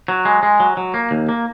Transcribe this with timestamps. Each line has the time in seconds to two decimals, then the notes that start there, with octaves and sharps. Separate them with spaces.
0.08 F#3
0.25 G#3
0.43 G#3
0.60 F#3
0.77 F#3
0.94 A#3
1.11 D#2
1.29 A#3